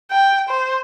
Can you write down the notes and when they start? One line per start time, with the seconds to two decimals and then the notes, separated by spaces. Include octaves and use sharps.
0.11 G5
0.49 C5